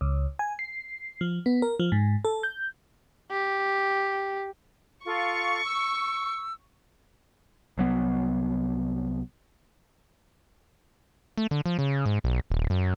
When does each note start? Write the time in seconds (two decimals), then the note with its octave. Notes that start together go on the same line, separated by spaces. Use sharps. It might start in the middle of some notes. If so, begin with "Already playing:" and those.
0.01 C#2
0.39 G#5
0.59 C7
1.21 F3
1.46 B3
1.62 A#4
1.80 F3
1.92 G#2
2.25 A4
2.43 G6
3.31 G4
5.06 F4 A4 F5 C#6
5.64 E6
7.78 C2 F#3 B3
11.38 A3
11.51 D3
11.66 F3
11.79 C#3
12.06 G#2
12.24 B1
12.50 D#1
12.70 F#2